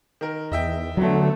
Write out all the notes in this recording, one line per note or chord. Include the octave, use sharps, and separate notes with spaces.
D#3 A#4
E2 D#5 E5 G5
D3 F#3 A3 B3